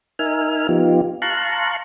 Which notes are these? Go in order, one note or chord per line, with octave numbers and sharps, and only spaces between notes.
D#4 A#4 E5 G#5 F6
F3 B3 D#4 F4 G4
F5 A5 A#5 C6 C#6 F#6